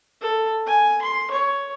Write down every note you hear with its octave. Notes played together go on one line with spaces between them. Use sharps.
A4
G#5
C6
C#5